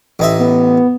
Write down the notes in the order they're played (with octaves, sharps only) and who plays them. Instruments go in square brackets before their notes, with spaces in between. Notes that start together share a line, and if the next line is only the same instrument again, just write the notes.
[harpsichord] A1 D#4 E5
[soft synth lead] B3